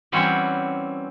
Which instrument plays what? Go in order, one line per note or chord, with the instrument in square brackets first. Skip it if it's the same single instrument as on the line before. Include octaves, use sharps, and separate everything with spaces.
[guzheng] E3 G3 C4 C#4 F#4 C6